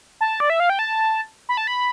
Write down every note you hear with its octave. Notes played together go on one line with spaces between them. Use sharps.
A5
D5
E5
F5
G5
A5
B5
A5
B5